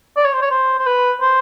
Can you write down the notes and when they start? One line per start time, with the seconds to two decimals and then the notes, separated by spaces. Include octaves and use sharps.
0.16 D5
0.25 C#5
0.34 C5
0.42 C#5
0.51 C5
0.79 C5
0.86 B4
1.21 C5